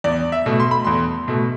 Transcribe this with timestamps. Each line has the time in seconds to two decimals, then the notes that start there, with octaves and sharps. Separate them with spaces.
0.04 E2 D5
0.32 E5
0.46 B2 A3
0.60 C6
0.71 B5
0.84 E2 C6
1.28 B2 A3